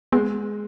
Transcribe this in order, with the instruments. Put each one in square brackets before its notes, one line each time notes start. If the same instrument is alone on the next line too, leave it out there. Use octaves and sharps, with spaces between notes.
[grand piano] G#3 [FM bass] B3